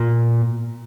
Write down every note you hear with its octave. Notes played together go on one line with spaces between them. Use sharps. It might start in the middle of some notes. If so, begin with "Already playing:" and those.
Already playing: A#2